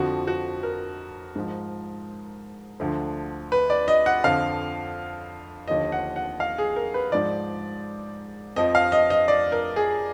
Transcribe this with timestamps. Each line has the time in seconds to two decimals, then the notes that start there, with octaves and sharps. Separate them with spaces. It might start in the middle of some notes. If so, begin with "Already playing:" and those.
Already playing: F2 D3 F3 F#4
0.27 F#4
0.63 A#4
1.35 G#2 F3
2.80 D2 D3 F3
3.52 B4
3.70 D5
3.88 D#5
4.06 F#5
4.24 F2 D3 F3 F5
5.68 D#2 D3 F3 D#5
5.92 F#5
6.16 F#5
6.40 F5
6.58 G#4
6.76 A#4
6.94 B4
7.12 G#2 F3 D5
8.56 F2 F3 D#5
8.75 F5
8.92 D#5
9.10 D#5
9.28 D5
9.52 A#4
9.76 G#4